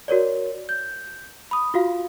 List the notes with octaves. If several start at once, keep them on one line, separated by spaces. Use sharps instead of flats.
F#4 A#4 C#5 D5
G6
B5 D#6
F4 F#4 F5